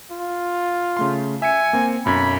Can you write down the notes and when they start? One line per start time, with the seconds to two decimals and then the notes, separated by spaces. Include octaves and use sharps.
0.11 F4
0.97 C#3 A3 C6
1.42 E5 G#5 C#7
1.73 A#3 C4
2.05 B1 F#2 B5 G#6